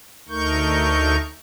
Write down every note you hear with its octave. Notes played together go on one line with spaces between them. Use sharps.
D2 A3 D#4 A#4 C#6 G6